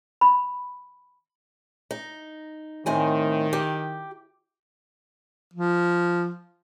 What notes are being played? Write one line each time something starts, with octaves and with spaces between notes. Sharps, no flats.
B5
D#4
A2 D#3 C4 G#5
G4
F3